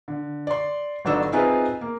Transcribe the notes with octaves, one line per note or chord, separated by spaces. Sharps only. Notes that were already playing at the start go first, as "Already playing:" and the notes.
D3
D5 C6
G1 F#3 D4 D#4 A4 E7
C4 D#4 F4 G#4 B4 E5
A#3